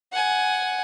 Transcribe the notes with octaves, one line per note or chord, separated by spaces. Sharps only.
F#5 G#5